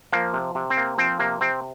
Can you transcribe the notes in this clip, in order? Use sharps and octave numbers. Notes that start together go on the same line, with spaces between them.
F3 A#3
C3
C3
C4
A#3
F3 C4
C3 A#3
C3 C4